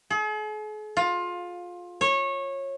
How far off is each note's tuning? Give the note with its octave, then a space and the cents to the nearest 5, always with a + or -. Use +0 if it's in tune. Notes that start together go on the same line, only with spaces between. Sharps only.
G#4 +45
F4 +20
C#5 -20